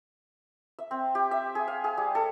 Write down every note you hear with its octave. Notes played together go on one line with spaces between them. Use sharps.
E5
C4
G4
E5
G#4
F5
G#4
G3
A4